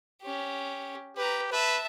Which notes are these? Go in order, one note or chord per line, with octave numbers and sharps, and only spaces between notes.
C#4 G4
G4 B4 A#5
B4 E5 A5